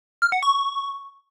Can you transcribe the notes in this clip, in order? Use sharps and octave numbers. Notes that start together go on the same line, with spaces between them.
F6
F#5
C#6